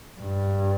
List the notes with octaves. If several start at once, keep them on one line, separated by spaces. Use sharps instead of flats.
G2